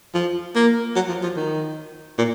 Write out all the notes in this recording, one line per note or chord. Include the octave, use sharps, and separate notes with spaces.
F3
A#3
F#3
F3
F3
D#3
A#2